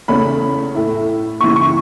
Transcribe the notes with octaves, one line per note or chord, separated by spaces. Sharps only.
E2 C#3 A3 C#4 B5
A2 A3 E4
C#3 E3 B3 E4 C#6
C#6